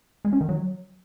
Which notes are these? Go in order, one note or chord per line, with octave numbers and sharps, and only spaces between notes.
G#3
C#4
D#3
F#3